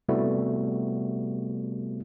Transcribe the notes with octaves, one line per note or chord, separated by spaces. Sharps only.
C3 G3 A3 B3 E4 F#4